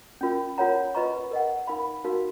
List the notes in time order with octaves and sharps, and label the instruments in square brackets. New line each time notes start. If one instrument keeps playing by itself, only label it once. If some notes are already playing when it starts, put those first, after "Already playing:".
[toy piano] C#4 F4 A#4
F4 A#4 C#5 F#5 A#5
F4 B4 D#5 A#5 C#6
A#4 D#5 F#5
D#4 A#4 F5 B5
D#4 F#4 A#4 F5